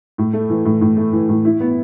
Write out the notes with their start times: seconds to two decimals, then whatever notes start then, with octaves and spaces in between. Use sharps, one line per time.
0.18 A2
0.33 A3
0.50 E3
0.65 A2
0.81 A2
0.97 A3
1.13 E3
1.29 A2
1.45 E4
1.60 B3